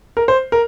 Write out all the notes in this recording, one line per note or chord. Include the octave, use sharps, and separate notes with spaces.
A#4
C5
A#4